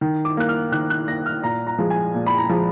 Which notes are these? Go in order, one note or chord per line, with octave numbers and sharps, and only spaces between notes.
D#3
D6
A#3 F#6
F6
D#3 F#6
F#6
A#3 A#6
F6
A#2 A#5
A#5
F3 G#3
G#5
A#2
B5
A#5
F3 G#3